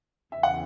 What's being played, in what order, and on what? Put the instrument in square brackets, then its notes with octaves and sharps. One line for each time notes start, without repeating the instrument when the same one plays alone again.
[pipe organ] E2 C#3 E3 [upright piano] E5
[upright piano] F#5